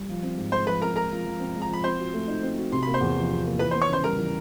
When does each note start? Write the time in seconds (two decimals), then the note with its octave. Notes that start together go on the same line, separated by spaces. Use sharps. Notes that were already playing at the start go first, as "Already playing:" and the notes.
Already playing: G3
0.09 F3
0.23 C4
0.37 G#2
0.52 G#3 C5 C6
0.67 F3 B4 B5
0.81 C4 A#4 A#5
0.96 G#3 A#4 A#5
1.11 F3
1.26 F3
1.40 C4
1.55 G#3
1.62 A#5
1.69 F3 B5
1.84 C4 C5 C6
1.99 F#4
2.14 A3
2.28 D#4
2.43 C4
2.58 F#4
2.72 C3 C6
2.83 A#3 B5
2.94 C5 C6
3.01 E2
3.16 F3
3.31 C3
3.45 A#3
3.59 E3 B4 B5
3.71 C5 C6
3.75 B3
3.82 C#5 C#6
3.89 C#3 C5 C6
4.04 G3 A#4 A#5
4.18 E3